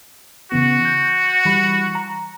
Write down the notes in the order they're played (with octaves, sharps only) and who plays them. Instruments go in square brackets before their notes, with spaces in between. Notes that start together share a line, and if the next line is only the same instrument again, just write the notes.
[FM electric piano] C#3 E3 B3 [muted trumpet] F#4
[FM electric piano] G6
E3 G3 B5
A#5